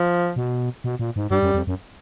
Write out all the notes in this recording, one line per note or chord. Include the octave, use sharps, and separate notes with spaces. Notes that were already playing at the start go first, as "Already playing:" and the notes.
Already playing: F3
B2
B2
A#2
G#2
G2 G3
F#2
F2
F#2